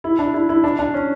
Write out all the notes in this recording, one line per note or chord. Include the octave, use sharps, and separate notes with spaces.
E4
D4
E4
E4
D4
D4
C#4